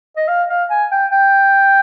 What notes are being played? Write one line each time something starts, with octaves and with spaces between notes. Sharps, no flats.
D#5
F5
F5
G#5
G5
G5